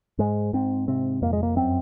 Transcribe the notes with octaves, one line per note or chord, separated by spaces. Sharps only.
G#2 G#3
G#2 C4
C3 C4
F2 A#3
G#3
A#3
F#2 C4